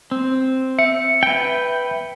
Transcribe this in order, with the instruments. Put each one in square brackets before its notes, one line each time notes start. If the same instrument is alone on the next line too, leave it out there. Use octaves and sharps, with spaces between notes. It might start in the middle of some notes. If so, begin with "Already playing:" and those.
[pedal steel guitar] C4
[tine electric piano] E5 C#7
[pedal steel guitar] B4 G5